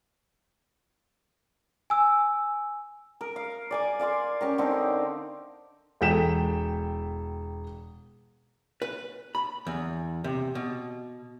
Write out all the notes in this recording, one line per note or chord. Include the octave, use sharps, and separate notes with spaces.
G#5 E6
A#4
F5
D5 G#5 D6
D5 F5 G#5 C6
C#4 G4 A#4
D3 C4 D#4
E1 A4 G5 B6 E7
B4
B5
E2
C3
B2